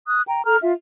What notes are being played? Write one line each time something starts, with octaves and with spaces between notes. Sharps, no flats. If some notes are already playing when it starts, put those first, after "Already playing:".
D#6 F#6
G5 A#5
A4 A#5 F6
F4 E5